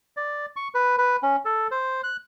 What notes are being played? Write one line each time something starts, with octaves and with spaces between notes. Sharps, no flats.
D5
C#6
B4
B4
C#4
A4
C5
F#6